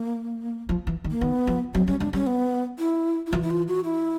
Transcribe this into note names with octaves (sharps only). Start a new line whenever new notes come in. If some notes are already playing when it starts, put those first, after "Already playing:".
Already playing: A#3
F3
E3
D#3
A#3
D#3 B3
F3
F#3 C4
G3 C#4
G#3 D4
G3 C#4
B3
E4
E4
E3 F4
E4
F4
F#4
E4